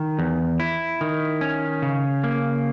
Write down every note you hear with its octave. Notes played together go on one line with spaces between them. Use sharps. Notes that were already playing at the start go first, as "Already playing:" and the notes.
Already playing: D#3
E2
E4
D#3
C#4
C#3
A#3